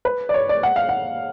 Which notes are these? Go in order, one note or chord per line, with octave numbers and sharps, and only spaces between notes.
B4
D5
C#5
D5
F#5
F5
F#5